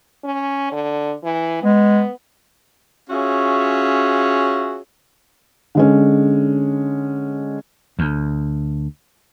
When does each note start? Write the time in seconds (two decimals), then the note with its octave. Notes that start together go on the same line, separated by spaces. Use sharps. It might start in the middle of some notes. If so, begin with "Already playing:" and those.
0.24 C#4
0.71 D3
1.23 E3
1.63 G#3 B3
3.10 C#4 F4 F#4 G#4 C#5 E5
5.75 D3 G#3 C#4
7.99 D2